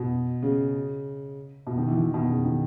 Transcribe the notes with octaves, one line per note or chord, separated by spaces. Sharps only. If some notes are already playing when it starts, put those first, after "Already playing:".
Already playing: B2
C#3
B2
D#3
E3
D#3
B2
C#3
D#3